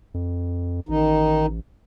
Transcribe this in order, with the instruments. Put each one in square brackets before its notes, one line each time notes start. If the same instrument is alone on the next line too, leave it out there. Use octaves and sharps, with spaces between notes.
[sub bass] F2
[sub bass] A1 [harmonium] D#3 D#4